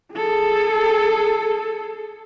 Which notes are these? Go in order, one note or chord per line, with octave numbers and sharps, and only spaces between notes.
G#4 A4